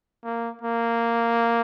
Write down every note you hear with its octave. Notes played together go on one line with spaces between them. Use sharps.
A#3
A#3